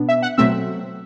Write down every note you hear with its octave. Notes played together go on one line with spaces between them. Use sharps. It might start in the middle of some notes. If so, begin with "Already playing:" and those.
Already playing: B2 B3 D4
E5
F#5
B2 F#3 A3 C4 E5